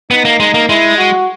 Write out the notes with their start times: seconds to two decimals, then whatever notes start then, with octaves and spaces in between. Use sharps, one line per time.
0.11 B3 D#4
0.25 A#3
0.40 G#3
0.54 A#3
0.69 G#3 E4
0.98 F#4